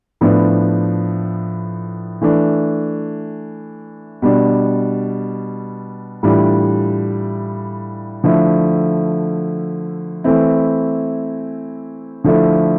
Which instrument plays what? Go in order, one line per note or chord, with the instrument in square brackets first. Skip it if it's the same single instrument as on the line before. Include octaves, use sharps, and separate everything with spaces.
[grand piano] A2 F3 B3 D4
E3 A3 D4
B2 G3 D4
A2 E3 G3 D4 F4
D3 F3 A3 E4
E3 A3 C4 E4
D3 F3 A3 E4